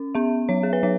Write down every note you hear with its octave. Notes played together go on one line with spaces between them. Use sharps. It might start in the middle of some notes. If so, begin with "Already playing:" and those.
Already playing: C#4
B3 E5
F#3 C#5
G#4
B4
F#3 C#5